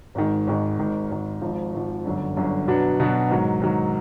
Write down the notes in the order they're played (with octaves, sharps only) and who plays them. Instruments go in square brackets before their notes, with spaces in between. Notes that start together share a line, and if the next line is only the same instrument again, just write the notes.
[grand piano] G#1 G#2 D#3 G#3
G#1 G#2 D#3 G#3
G#1 G#2 D#3
G#1 G#2 D#3
G#1 G#2 F3
G#1 G#2 F3
G1 F#2 D3
G1 F#2 D3
B2 F#3 B3 D4 F#4
B2 F#3 B3 D4 F#4
G#2 D#3 F#3
G#2 D#3 F#3